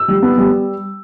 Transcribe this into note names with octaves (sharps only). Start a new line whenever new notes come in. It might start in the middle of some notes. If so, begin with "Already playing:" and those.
Already playing: E6
G3
B3
G3